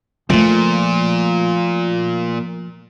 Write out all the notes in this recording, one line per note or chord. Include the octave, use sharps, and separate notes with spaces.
A#2 F3 A3